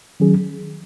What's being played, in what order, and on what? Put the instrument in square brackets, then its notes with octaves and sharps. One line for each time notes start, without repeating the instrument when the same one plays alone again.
[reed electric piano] D#3 F#3 C#4 G#4